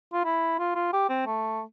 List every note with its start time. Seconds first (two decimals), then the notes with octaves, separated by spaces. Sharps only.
0.13 F4
0.25 E4
0.59 F4
0.75 F4
0.93 G4
1.09 C4
1.26 A3